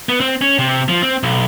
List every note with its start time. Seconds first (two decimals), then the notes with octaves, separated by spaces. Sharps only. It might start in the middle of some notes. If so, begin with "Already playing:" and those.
0.09 B3
0.20 C4
0.41 C#4
0.59 C3
0.88 F3
1.02 C4
1.23 B1